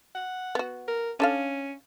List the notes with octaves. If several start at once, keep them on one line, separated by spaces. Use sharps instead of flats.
F#5
B3 F#4
A#4
C#4 D4 A4 F5